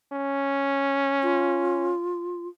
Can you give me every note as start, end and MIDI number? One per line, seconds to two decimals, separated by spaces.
0.13 1.92 61
1.23 2.47 65